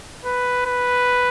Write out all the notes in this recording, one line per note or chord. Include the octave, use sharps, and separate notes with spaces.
B4
B4